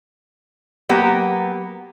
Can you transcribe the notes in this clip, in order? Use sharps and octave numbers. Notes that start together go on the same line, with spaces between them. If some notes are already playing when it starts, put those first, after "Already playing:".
F#3 A#3 B3 G4